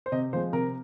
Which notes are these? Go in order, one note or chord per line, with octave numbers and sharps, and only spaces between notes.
C5
C3 D#5
F3 G#3 C5
C3 A#4